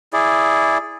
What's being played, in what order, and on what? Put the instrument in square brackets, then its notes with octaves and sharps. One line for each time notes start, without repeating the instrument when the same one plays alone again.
[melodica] E4 G#4 D5